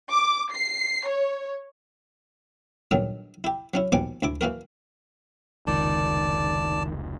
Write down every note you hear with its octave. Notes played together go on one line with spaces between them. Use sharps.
D6
C7
C#5
E2 G2 A#2 D3 D#3 F#3
E4 G4
F#3 C#4 E4
D#2 B2 F3 G3 G#5 D6
D2 E4 D6
E3 A#3 F#4 A#4
F1 C#2 D#3 D5 A5